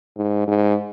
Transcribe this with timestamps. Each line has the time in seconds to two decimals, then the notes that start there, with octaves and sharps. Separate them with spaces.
0.17 G#2
0.48 G#2